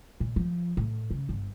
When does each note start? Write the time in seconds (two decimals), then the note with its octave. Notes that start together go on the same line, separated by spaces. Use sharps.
0.20 A#2
0.36 F3
0.77 A2
1.11 C#3
1.29 G1